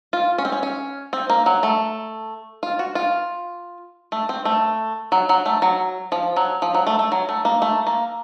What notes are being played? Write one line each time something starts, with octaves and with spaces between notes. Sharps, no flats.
F4
C#4
C4
C#4
C#4
C4
A#3
F#3
A3
F4
F#4
F4
A3
C4
A3
F#3
F#3
A3
F#3
F3
F#3
F3
F#3
A3
A3
F#3
A3
A#3
A3
A#3